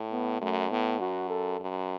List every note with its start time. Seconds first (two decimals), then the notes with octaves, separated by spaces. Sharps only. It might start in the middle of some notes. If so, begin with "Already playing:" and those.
Already playing: A2
0.12 B3
0.41 F#2 A3
0.71 A2 B3
1.01 F#2 F#4
1.30 A4
1.60 F#2